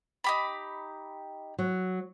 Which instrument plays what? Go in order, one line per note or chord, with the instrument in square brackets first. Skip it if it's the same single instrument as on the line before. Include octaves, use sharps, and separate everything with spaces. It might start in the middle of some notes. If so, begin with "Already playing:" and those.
[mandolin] D#4 G4 B5
[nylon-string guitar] F#3